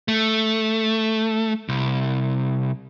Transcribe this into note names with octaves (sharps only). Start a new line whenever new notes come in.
A3
C2